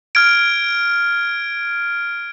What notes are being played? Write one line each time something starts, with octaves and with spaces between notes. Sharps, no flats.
F6 G#6 D7